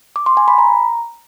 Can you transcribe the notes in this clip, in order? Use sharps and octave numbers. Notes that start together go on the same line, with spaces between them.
D6
C6
G#5
B5
A#5